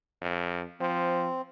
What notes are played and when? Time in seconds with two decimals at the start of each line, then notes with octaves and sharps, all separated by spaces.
0.21 F2
0.80 F3 C4